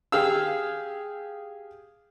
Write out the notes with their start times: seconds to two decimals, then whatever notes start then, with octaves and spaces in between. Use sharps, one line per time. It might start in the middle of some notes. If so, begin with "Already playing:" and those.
0.12 G4 G#4 F5 E6